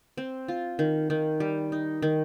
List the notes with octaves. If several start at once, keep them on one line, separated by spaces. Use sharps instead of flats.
C4
F4
D#3
D#3
G3
D#4
D#3